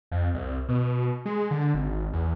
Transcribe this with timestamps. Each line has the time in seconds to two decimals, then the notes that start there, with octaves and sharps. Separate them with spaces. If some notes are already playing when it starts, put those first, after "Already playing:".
0.11 F2
0.35 C2
0.69 B2
1.25 G#3
1.51 D3
1.74 G#1
2.13 E2